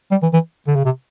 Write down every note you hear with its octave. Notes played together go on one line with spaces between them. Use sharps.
G3
E3
E3
D3
C#3
C3